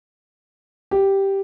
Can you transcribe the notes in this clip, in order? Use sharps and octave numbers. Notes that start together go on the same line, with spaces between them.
G4